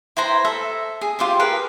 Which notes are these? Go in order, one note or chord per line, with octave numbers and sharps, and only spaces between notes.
E4 B4 C5 A#5
A4 E5
G#4
F4 G4 C5 E5
G#4 A#4 B4